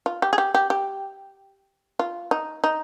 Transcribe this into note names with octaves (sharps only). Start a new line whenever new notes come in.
F4
G4
G#4
G4
G4
G4
F4
D#4
D#4